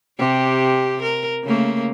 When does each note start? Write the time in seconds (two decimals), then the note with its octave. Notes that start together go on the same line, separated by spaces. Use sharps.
0.18 C3 G4
1.02 A#4
1.43 C#3 A3 A#3